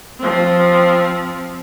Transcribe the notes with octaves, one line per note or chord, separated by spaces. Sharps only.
F3 C4